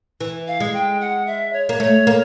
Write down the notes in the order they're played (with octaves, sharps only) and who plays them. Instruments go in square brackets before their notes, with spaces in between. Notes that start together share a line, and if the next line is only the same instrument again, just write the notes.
[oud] E3
[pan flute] F5
[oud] G#3
[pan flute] G5
F#5
E5
C#5
[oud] A#3
[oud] A3 [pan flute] C#5
[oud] A#3